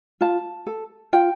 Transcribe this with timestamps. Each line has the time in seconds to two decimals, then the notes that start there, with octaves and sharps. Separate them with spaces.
0.21 F4 A5
0.67 A4
1.13 F4 G5